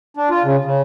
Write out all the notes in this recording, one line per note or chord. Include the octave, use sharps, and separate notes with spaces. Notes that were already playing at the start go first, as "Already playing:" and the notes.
D4
F4
C#3
C#3